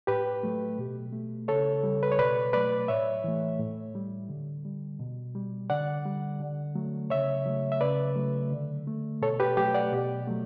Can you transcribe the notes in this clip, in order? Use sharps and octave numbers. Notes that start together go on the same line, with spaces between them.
A2 G4 B4
F#3 A3
B2
A3
C#3 A4 C#5
G3
B4
C#5
B2 B4 D5
F#3 A3 B4 D5
A2 C#5 E5
E3 A3
A2
G3
D3
G3
B2
G3
D3 D5 F#5
G3
D3
F#3 A3
C#3 C#5 E5
F#3 A3
E5
C#3 B4 D5
F#3 A3
D3
A3
B2 A4 C#5
G4 B4
F#3 A3 G4
D5 F#5
B2
F#3 A3